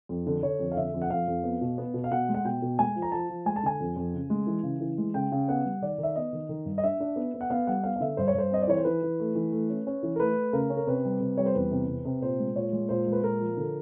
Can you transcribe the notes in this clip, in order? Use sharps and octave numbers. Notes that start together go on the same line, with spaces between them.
F2
D3
D3 C#5
F2
F5
D3 E5
F2
F#5
F2 F5
F2
B3
B2
B3
B2
F5
B2 F#5
G#3
F#5
B2 G5
B2
G#3 G#5
F3
A#5
F3 A5
F3
G#3 G#5
A5
D3 G#5
F2
F2
C#3
G#3
E3
C#3
E3
G#3
C#3 G5
C#3
B3 F#5
G3
D#3 D5
D#3
E5
B3 D#5
D#3
D#3
G2
D#5
D4 E5
D4
B3
B3
F#5
B3 F5
G3 F#5
B3 F5
F5
D3 E5
G2 C5
C#5
G2 C5
C4 D#5
D5
E3 C#5
C5
E3 B4
E3
A3
E3
A3
C#4
C#4
E3
A#4
A3 B4
A3
C#3 A#4
C#4
A#4
C3 B4
G3
C3
G3 C#5
C5
E2 B4
C3
C3
C3
A#2 C5
G#3
A#2 C#5
G#3
A#2 C5
G#3
B4
A#2 A#4
F3
D3